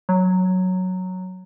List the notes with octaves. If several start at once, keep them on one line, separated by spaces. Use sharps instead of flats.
F#3